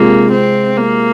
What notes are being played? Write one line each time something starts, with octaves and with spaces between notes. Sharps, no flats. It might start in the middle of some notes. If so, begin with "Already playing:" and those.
Already playing: C3 G#3 A#3 F4 G#4
C4
A#3